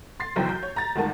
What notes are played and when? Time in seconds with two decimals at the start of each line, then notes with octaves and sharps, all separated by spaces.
0.20 C6 A6 C7
0.36 F#1 B1 F#2 E3 C5 G5
0.49 G6
0.63 C#5
0.76 A#5 A6
0.96 G1 D2 G#2 D#3 A#4 A5